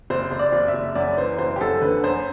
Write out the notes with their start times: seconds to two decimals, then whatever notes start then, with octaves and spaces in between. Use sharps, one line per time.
0.10 F#1 C5
0.31 F#1
0.39 D5
0.53 F#1
0.68 E5
0.74 F#1
0.95 F#2 D5
1.17 E3 C5
1.38 F#1 C5
1.56 G4
1.61 F#2 A4
1.81 D3 B4
2.04 F#2 C5